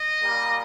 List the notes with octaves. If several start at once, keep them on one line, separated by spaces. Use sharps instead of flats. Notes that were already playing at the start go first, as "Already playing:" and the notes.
Already playing: D#5
A#2 G3 A#3